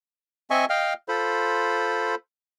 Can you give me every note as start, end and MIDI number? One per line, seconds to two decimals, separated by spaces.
0.50 0.65 60
0.50 0.65 75
0.50 0.65 76
0.50 0.65 80
0.50 0.65 85
0.70 0.94 75
0.70 0.94 77
0.70 0.94 79
0.70 0.94 89
1.08 2.15 65
1.08 2.15 69
1.08 2.15 72
1.08 2.15 83